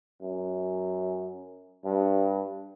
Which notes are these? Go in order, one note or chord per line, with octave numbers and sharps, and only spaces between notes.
F#2
G2